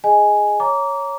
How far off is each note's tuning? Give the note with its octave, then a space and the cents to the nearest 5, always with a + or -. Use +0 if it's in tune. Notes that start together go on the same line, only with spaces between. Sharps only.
G#4 +0 D#5 +0 G#5 +0
C#5 +0 A#5 +0 D6 -25